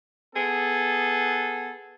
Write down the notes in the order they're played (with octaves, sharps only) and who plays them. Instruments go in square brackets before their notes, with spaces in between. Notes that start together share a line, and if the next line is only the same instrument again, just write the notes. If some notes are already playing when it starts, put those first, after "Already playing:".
[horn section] B3 G#4 A4